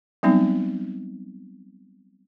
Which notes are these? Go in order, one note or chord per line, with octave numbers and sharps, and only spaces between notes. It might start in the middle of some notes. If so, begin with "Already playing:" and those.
F#3 G3 B3 C4 D#4